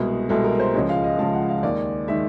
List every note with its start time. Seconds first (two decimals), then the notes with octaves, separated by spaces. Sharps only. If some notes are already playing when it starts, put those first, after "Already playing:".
Already playing: C2 B2 G#3
0.29 C2 B2 G#3 A4
0.44 A#4
0.60 C5
0.74 C#2 C#3 F3 G#3 C#5
0.89 F5
1.04 D#5
1.19 C#2 C#3 F3 G#3 A5
1.33 F#5
1.49 F5
1.63 D#2 D#3 G#3 D5
2.08 D#3 G#3 E5